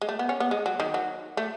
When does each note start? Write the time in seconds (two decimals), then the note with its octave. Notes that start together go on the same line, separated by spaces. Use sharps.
0.02 G#3
0.09 A3
0.19 B3
0.29 C#4
0.40 B3
0.51 G#3
0.66 F#3
0.80 D#3
0.94 F#3
1.37 A3